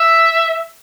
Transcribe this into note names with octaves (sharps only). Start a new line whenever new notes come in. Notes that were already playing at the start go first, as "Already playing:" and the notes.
Already playing: E5